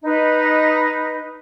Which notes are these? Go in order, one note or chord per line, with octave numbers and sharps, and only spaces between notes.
D#4 B4